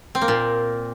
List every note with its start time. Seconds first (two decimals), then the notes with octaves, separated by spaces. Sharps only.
0.15 C4
0.21 A#3
0.28 A#2